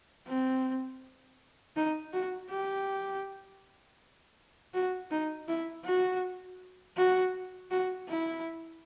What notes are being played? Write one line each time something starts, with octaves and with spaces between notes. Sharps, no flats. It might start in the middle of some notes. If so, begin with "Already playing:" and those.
C4
D#4
F#4
G4
F#4
D#4
E4
F#4
F#4
F#4
E4